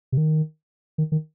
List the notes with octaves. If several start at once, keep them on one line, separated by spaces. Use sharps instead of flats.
C3
D#3
D#3
D#3